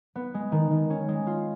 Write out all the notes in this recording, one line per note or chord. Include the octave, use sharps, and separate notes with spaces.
B3
G#3
D#3
D#3
C#4
G#3
F4